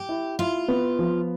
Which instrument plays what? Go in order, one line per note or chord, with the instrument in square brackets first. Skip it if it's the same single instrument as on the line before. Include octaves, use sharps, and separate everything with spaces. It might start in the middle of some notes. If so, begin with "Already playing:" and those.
Already playing: [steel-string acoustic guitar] G4
[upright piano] E4
[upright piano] E4 [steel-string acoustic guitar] F4
[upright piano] B3
F3